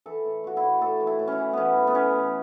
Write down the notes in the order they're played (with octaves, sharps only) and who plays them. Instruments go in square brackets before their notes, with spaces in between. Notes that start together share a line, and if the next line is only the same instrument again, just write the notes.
[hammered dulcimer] E3 A4
A2
A3 F#4
E4
A2
A2 A4
E3
E4
A2
C#4 E4
E3
E3 B3 C#4
A2
B3
E3 C#4
A2